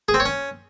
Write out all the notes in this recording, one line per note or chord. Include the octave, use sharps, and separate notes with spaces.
G#4
C4
C#5
C#4